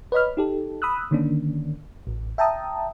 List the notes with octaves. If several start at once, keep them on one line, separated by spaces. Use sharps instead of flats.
B4 C#5 D#5 B5 F6
D#4 G4 A4
B5 D#6 E6 F#6
D3 D#3 A#3 C#4 D4
A1
E5 G5 A5 A#5 D#6